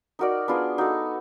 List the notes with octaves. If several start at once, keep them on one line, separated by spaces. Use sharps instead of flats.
D#4 F#4 A#4 D5
B3 D4 F4 G#4
D#4 F#4 A4